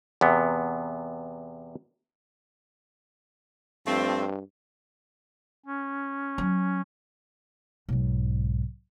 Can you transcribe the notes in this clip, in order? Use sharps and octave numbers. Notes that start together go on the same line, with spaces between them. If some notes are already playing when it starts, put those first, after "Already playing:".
E2 C3 B3
G2 F3 A3 C4
C#4
F#3
B1 G#2